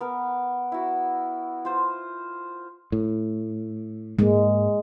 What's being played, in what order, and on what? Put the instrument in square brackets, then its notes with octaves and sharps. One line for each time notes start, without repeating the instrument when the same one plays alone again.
[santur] B3 A#4
E4 F#4
F4 C5
[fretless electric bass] A2
[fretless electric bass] G#2 A#3 [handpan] G#3